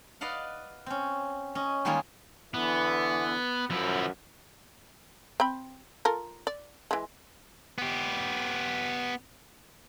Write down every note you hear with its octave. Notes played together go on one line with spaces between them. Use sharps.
B4 D5 D#5 F5 F#5
C4 C#4
C#4 D#5
D#3 G3 G#3 A#3 F4 G#4
D3 E3 B3
F#2 F3 E4
C4 G5 B5
F4 A4 A#4
D5
E3 G#3
B3 G4